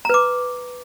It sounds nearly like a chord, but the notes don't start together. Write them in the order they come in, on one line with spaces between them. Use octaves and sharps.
A#5 B4 D6